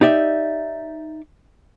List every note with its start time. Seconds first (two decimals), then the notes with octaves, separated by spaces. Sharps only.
0.01 D#4 G4 D5 E5